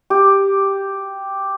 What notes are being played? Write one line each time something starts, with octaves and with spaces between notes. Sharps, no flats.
G4